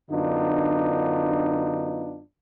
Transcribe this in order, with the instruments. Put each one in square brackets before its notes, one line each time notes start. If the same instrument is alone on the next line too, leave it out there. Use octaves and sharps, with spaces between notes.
[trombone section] F#2 D3 B3 D4 D#4 F4